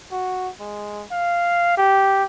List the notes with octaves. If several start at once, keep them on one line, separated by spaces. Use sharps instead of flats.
F#4
G#3
F5
G4